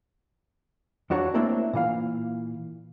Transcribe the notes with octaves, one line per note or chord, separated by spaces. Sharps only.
F2 D4 F#4 C#5 A#5
A3 A#3 C4 D4 E4 A#4
A#2 E3 F5